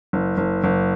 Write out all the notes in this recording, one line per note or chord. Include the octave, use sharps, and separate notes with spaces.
F#1
F#1
F#1